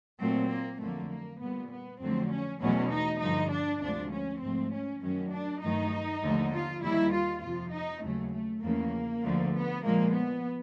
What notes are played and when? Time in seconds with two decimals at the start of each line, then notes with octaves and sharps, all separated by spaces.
0.20 A#2 F#3 A3 C4
0.50 A#3
0.80 F2 D3 F#3 A3 A#3
1.10 A#3
1.40 A#2 G3 B3
1.71 B3
2.00 F2 D3 F#3 A3 C4
2.31 C#4
2.61 E2 B2 F#3 A3 C#4
2.92 D#4
3.21 G2 D3 F3 D#4
3.51 D4
3.81 D2 C3 F3 G#3 D4
4.12 C#4
4.42 G#2 F3 A3 C4
4.72 C#4
5.02 F#2 D#3 F#3 A3 C#4
5.32 D4
5.63 G2 D#3 F#3 A3 D#4
6.23 D#2 D3 F3 A3
6.53 F4
6.83 D#2 D#3 G3 E4
7.13 F4
7.43 F2 C3 F3 F4
7.73 D#4
8.03 D#2 C#3 F#3 A3
8.34 A3
8.63 E2 C#3 F3 A3 A#3
9.24 D2 D3 F3 A3
9.54 B3
9.84 A#2 F3 G#3 A#3
10.14 B3